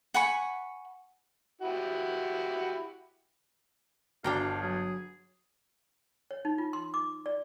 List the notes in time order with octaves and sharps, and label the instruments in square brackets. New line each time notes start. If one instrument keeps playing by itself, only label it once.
[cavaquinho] F#5 G#5 B5 C#6
[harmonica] E4 F#4 G4
[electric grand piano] G1 A5 [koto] D4 G5 A#5 [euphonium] F#4 [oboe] F5
[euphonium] F#3 [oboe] G#4
[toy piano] C#5
D#4
F4
C6
D6
D5